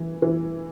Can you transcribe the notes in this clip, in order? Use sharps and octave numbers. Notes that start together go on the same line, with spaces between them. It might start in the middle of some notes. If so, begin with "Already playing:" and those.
Already playing: E3
E3